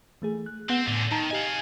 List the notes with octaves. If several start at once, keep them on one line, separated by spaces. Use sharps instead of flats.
E3 A3 G#4
F#6
B3 C4 F#5
E2 A2 D3
D#3 D#4 A5 A#5
G4 D#5 F5 G#5